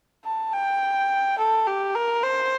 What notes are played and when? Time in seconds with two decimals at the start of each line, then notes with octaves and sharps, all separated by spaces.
0.25 A5
0.53 G5
1.38 A4
1.67 G4
1.95 A#4
2.23 C5